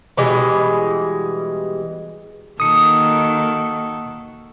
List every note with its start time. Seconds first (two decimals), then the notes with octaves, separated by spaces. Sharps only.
0.17 B2 E3 G3 G#3
2.60 D#3 A#3 F#4 A4 D#6 C#7